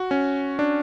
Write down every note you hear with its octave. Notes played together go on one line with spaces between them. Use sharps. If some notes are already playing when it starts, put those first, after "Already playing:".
Already playing: F#4
C#4
D4